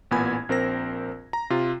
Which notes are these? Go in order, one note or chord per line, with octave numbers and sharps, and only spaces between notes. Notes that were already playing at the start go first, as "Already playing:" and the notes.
A1 A#2 B3 G#5 B5 G#6
A#1 C4 A#4 C5 A#6
A#5
C3 F4